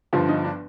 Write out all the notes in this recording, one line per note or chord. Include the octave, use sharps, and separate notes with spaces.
G1 G2 F3 F4
D#4
D4